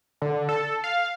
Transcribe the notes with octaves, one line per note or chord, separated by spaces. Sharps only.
D3
A4
F5